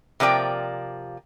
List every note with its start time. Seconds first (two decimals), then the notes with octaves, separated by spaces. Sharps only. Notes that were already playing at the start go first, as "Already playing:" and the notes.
0.20 C3 F3 A#3 D5 G5